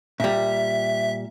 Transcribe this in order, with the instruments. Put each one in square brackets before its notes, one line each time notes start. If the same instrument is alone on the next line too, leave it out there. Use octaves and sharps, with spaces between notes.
[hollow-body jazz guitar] A#2 G3 [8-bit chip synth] E5